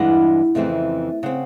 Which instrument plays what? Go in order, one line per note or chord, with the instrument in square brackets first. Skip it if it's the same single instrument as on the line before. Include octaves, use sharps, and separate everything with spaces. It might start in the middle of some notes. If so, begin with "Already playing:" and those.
Already playing: [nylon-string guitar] G2 E3 G#3 B3 D4 F#5
F2 C#3 E3 A3 C4
C#3 C4 F#5